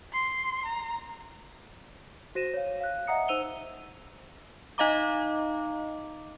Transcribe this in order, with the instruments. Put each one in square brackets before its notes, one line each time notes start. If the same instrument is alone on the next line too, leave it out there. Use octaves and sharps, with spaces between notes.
[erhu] C6
A#5
[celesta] F#4 C5 A#6 D#7 E7
C#5 F5
F5 F#6
D#5 E5 F#5 A#5 D#6 C#7
D#4 C5 E6 D#7 F7 G7
[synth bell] D#4 D#5 F5 A#5 D6